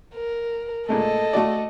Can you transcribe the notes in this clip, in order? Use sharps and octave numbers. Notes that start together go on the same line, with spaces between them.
A#4
A#2 G#3 A3 A4 D#5
A3 F#4 D5